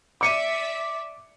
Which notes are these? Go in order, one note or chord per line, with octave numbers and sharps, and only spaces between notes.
D5 E5 D6 B6 C#7 D#7